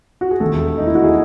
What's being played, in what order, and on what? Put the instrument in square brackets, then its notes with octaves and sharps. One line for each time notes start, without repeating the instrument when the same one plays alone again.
[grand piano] F#4
G#4
E1 D#2 D#3 A3 A4
D#4
E4
F#4
G#4